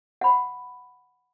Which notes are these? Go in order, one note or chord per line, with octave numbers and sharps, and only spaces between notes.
F#5 B5